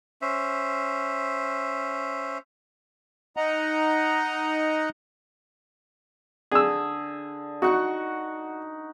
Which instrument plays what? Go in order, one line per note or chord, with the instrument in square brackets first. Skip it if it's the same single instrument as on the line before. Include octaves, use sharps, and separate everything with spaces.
[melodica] C#4 C5 E5
[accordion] D#4 D#5 F#5 A#5
[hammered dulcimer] D3 [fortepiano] G#4 E6
[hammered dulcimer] D#4 F#5 C#6 [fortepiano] F#4